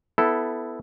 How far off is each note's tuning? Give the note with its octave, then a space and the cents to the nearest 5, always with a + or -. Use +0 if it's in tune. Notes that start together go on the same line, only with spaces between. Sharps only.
B3 +15 E4 +0 A4 +0